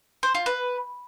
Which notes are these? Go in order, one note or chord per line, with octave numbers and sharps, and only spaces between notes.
C5
F4
B4